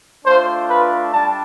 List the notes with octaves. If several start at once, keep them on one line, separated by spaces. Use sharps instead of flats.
A3 D4 F4 C5
B4
G3 D4 A5